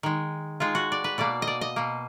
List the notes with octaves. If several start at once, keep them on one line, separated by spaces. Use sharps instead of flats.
D#3 G#3
D#3 G#3 F4
F#4
D5
B4
B2 A#3 D5
D#5
D5
D#5
B2 A#3